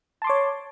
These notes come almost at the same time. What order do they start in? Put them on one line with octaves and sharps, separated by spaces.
A5 C6 D6 C#5